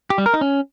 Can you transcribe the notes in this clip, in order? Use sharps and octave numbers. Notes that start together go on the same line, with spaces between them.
G4
G3
A#4
D#4
C#4